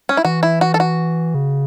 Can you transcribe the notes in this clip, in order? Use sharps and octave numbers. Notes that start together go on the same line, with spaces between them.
C#4
E4
E3 F#4
E4
F#4
A4
F#4
C#3